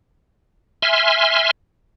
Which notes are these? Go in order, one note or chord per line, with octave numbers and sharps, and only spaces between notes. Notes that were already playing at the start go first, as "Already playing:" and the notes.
E5 G#5 C6 F6